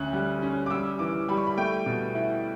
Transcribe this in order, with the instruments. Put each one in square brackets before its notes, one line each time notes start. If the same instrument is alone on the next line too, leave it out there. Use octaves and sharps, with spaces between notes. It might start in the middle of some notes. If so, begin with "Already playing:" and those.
Already playing: [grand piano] D2 C#4 F#6
G3
C#4
D6
G3 E6
E3 D6
G3 B5
C#6
B5
A3 G5
B2
E4